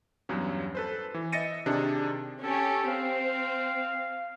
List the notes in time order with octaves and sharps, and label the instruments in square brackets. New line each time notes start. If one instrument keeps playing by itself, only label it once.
[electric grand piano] E2 G2 F#3 C#4
A4 B4 C5
E3
D#5 E5 A6 A#6 C#7 D#7
C3 D#3 D4 G#4
[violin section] C#4 G4 [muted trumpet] A4
[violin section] C4 [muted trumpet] F5